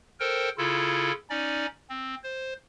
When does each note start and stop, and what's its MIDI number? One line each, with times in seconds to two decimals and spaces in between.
0.20 0.49 69
0.20 0.49 70
0.20 0.49 72
0.20 0.49 79
0.58 1.12 49
0.58 1.12 64
0.58 1.12 65
0.58 1.12 69
1.30 1.66 61
1.30 1.66 63
1.30 1.66 74
1.89 2.15 60
2.23 2.53 72